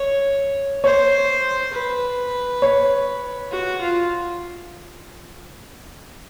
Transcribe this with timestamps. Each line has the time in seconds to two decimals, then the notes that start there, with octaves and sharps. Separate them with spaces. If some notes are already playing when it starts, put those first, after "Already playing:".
Already playing: C#5
0.84 C5 C#5
1.73 B4
2.62 C#5
3.51 F#4
3.81 F4